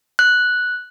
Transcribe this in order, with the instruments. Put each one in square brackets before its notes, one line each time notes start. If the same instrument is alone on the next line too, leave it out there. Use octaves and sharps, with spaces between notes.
[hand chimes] F#6